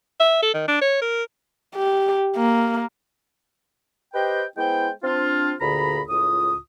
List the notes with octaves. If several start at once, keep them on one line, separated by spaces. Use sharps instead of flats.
E5
A4
D#3
D4
C#5
A#4
G4
A#3
G4 B4 C5 D#5 G5
G#3 B3 E4 C5 G5
C4 D4 F4
D2 A#2 D3 G#4 A#5 B5
C#2 A2 F4 D#6